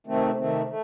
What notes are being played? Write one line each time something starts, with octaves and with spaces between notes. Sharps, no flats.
C3 D#3 A3 C4
C3 D#3 A3 C4
A3